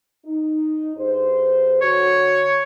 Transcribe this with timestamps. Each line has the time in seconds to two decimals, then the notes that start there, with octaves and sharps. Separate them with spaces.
0.24 D#4
0.97 G2 G#4 C5
1.82 D3 F#4 C#5